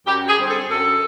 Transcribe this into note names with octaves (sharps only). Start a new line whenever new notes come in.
F#2 G4
G#4
D3 G3 C4
A4
F#2 A4